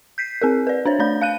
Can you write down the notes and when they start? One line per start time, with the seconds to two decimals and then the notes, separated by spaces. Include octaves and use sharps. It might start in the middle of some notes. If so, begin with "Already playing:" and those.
0.18 G6 B6 C7
0.42 C4 G#4 A#4
0.67 B4 D5
0.85 D4 C5 C#5
0.99 A3 D4 C#5 D5 B5 G6
1.21 F5 F#6 D#7